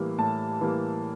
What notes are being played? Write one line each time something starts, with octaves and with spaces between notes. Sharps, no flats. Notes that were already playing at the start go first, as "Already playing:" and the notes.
Already playing: A2 E3 G3 A#3
A2 A5
E3 G3 A#3